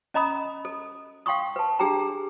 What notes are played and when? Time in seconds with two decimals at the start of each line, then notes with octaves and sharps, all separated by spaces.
0.14 C#4 D#5 A#5 B5 D#6
0.65 A4
1.26 F5 G5 C6 C#6 D#6
1.56 B4 A5
1.79 D4 G4 G#4 G5 A#5